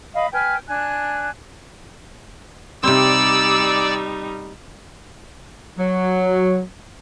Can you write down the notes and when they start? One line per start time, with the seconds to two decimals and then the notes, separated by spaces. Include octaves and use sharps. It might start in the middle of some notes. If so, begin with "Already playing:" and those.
0.14 D#5 F5 B5
0.33 B4 G5 G#5 F6
0.67 D4 G#5 F#6
2.83 C3 G3 C4 D#4 D5 E6
5.78 F#3